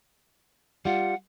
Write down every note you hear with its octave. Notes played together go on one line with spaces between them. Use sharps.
G3 F4 F#5